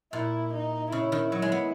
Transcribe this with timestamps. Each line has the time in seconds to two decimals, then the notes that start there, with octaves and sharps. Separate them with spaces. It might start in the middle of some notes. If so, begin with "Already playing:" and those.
0.12 A#2 E4
0.53 D#4
0.92 C#3 E4
1.12 D#3
1.32 F#3
1.42 G#3
1.52 B3